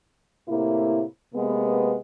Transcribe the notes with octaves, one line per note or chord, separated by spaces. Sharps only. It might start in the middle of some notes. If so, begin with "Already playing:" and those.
A2 C3 A#3 E4
C3 G#3 A#3 B3